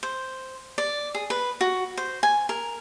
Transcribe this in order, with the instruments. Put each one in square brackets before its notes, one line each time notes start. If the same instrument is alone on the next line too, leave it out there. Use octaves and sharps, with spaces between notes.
[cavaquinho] C5
D5
G#4
B4
F#4
C5
G#5
A#4